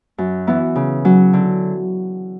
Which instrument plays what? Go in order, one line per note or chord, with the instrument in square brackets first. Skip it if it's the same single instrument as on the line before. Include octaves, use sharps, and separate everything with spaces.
[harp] F#2
E3 B3 E4
C#3
F#3 C#4
D3